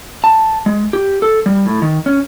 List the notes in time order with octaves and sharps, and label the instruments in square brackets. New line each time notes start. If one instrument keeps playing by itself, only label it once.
[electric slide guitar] A5
G#3
G4
A4
G3
A2
D#3
C#4